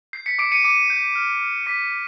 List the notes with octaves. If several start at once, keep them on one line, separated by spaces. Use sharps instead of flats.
G6 C7
B6 C#7
D6 C7 D7
C#7 D#7
D6 C#7 D#7
G6
F6
F6
D6 B6 C#7
D6